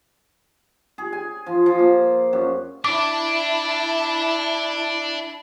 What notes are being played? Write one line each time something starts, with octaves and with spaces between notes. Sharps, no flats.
G#4
G#5
F3
F3
A#3
F#2
D4 E4 A5 D6